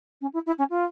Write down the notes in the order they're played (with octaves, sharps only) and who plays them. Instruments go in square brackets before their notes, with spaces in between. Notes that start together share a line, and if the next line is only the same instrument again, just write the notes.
[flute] C#4
E4
E4
C#4
F4